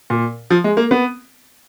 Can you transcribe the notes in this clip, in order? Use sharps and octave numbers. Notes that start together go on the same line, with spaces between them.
A#2
F3
G#3
A#3
B3